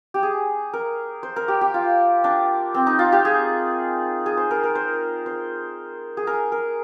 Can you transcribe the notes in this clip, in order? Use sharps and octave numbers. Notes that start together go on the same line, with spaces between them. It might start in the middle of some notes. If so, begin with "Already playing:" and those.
G4
G#4
A#4
C5
A#4
G4
G4
F4
D4
C4
D#4
F4
G4
G#4
G#4
C5
A#4
A#4
C5
C5
G#4
A#4
A#4